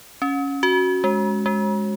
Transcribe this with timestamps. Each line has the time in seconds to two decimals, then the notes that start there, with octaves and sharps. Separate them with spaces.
0.22 C#4
0.63 F#4
1.04 G#3
1.46 G#3